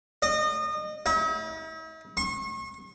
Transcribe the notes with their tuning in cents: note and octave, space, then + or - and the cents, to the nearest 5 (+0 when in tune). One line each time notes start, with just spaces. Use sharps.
D#5 -30
E4 -45
C#6 -40